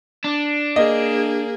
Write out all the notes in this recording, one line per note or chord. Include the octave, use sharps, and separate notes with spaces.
D4
A#3 G#4 D#5